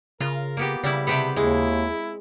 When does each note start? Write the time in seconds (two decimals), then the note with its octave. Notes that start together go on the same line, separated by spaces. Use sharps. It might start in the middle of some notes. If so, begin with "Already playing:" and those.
0.20 C#3 F4 A#4
0.57 A#3 B3 G4
0.84 C#3 G3 E4
1.07 C3 B3 C4 G4 B5
1.36 D#2 G#3 E4